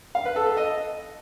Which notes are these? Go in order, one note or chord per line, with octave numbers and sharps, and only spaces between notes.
F5
B4
A4
A4
D#5